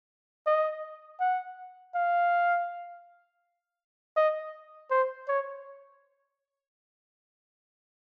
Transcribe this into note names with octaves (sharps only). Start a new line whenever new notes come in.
D#5
F#5
F5
D#5
C5
C#5